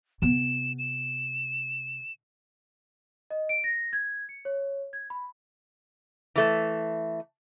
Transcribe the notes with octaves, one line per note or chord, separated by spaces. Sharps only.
C3 B3 E7
E7
D#5
D7
A#6
G#6
C#7
C#5
G#6
B5
E3 A3